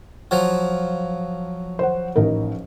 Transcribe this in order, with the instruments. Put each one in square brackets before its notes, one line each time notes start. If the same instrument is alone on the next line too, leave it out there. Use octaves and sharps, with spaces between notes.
[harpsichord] F3 F#3
[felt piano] C5 F#5
A1 D#4 A#4